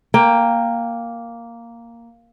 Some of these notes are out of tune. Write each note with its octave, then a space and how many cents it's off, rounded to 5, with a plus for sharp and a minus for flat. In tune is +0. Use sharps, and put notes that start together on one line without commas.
A#3 +0 G5 +15